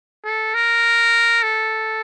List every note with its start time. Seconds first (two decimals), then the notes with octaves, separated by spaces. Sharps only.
0.25 A4
0.54 A#4
1.43 A4